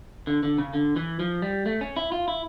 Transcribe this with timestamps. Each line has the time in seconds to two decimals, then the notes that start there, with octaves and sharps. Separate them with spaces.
0.27 D3
0.43 D3
0.58 C#3
0.73 D3
0.96 E3
1.20 F3
1.42 G3
1.66 A3
1.81 C#4
1.96 E4
2.12 F4
2.28 E4